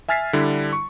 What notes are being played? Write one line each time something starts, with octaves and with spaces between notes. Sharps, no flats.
E5 G#5 F6 A6 B6 C7
D3 G3 D4 E4
C#6